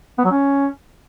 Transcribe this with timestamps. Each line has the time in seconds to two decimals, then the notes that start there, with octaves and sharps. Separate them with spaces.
0.18 B3
0.25 F#3
0.31 C#4